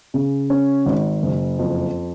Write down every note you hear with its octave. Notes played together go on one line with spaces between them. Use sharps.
C#3
C#4
G#1
F#1
F2